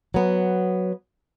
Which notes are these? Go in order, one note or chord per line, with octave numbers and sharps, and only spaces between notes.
F#3 B3